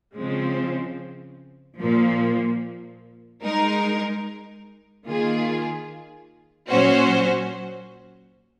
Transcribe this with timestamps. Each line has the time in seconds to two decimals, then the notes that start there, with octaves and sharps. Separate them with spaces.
0.17 C#3 F3 G#3 C4
1.80 A#2 F3 A#3
3.43 G#3 D#4 A#4
5.06 D#3 A#3 F4 G#4
6.69 A#2 F#3 C#4 F#4 C5